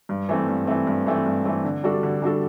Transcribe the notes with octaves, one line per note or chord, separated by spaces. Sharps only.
G2
E3 A3 C4
G2
E3 A3 C4
G2
E3 A3 C4
G2
E3 A3 C4
D3
G3 D4 F#4 A4
D3
G3 D4 F#4 A4